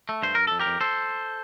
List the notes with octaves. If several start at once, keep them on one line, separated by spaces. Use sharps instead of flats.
A3
G2 C5
G2 A#4
F2 A4
G4 A#4
F2
A4 C5